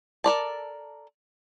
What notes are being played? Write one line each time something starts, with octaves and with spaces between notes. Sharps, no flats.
A4 A#4 D5 A5